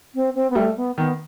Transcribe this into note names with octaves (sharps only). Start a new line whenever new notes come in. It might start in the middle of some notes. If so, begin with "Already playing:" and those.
C4
C4
B3
G3 A3
B3
D#3 B3